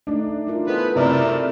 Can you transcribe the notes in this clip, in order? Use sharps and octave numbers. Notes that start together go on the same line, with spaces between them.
A3 D4 D#4
E4 F4 A#4
B3 G#4 A4 B4 C5
C3 A3 E4 A#4 D5 F6